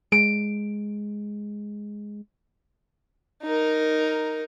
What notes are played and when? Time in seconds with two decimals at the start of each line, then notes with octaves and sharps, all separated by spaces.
0.12 G#3 D7
3.43 D#4 A#4